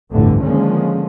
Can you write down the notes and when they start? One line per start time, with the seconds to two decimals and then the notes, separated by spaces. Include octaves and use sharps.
0.11 G1 C2 F2 A2 D3 E3
0.42 D3 D#3 F3 G#3 A#3 C#4